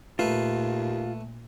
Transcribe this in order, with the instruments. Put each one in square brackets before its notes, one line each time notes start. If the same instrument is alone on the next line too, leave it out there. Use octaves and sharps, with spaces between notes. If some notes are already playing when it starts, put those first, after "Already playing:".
[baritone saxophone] D#2 [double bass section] A#2 [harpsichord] A3 B4 [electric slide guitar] F4